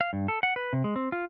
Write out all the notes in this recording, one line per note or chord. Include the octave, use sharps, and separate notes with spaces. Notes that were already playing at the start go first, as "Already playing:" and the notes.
F5
G2
A4
F#5
B4
C3
G#3
C4
F4